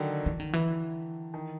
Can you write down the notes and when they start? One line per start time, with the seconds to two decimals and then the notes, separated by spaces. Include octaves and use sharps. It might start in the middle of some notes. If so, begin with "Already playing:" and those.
Already playing: D3 D#3 F#3
0.26 E3
0.40 D#3
0.53 E3
1.34 D#3